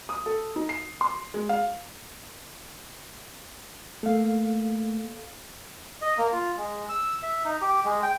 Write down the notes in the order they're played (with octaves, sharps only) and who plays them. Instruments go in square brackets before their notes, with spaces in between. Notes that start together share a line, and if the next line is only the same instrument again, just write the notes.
[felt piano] D#6
A4
D#4
C7
C6
G#3
F5
[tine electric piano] A3 A#3 [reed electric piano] A4 F5
[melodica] D#5
A#3
F4
G#3
E6
E5
D#4
G4
G#3
G5